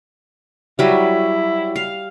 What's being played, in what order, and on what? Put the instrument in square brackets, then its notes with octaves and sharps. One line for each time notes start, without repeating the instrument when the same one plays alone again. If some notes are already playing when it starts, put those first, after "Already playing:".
[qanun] F#3 G3 [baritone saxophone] E4
[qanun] F5